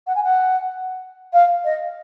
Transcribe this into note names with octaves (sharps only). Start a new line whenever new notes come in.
F#5
G#5
F#5
F5
D#5